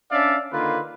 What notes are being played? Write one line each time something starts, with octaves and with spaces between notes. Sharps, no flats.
C#4 D4 D5 E5 F5
D3 D#3 A#3 F4 B4